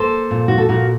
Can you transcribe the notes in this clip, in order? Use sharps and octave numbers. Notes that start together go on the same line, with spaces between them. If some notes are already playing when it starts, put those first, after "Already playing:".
Already playing: A#3 A4 C5
A#2
F#4
A4
A#2 F#4 A#4